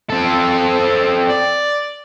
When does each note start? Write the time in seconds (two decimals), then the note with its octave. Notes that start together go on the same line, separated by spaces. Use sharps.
0.10 C4 A4
1.28 D5